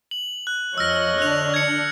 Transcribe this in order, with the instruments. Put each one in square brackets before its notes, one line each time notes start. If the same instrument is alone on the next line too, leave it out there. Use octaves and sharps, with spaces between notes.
[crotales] F#7
F#6
[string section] F2 F3 [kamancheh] C#5 D#5 [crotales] E6 F6 A#6
[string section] D3 D4 [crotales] F#6 F7
[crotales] G#6 C#7